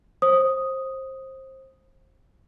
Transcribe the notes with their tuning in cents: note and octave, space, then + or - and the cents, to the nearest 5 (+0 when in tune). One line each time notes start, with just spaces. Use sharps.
C5 +25 D#6 +0